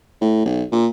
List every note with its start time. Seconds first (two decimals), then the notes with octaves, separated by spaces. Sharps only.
0.21 A2
0.46 B1
0.72 A#2